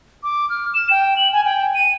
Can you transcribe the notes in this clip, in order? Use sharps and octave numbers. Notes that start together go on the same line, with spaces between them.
D6
F6
E7
G5
F#7
G#5
G5
D#7